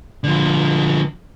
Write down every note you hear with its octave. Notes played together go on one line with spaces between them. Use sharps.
D3 F3